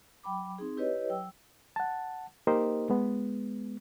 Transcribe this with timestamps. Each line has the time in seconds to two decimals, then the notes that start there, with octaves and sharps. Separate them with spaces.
0.24 F#3 G5 B5 D6
0.58 C4 D#4 G#4
0.77 E4 G4 B4 C#5 D#5
1.09 F#3 G5 E6
1.76 F#5 A5
2.47 A#3 D#4 G4 A#4 C5 D#5
2.90 G#3 B3